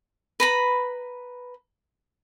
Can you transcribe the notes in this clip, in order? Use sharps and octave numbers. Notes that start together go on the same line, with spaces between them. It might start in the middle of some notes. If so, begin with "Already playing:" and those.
B4 A#5 B5